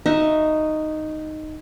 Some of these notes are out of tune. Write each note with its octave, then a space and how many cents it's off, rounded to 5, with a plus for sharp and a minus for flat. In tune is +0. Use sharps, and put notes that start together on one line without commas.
D#4 -5 F#4 +0 E5 +0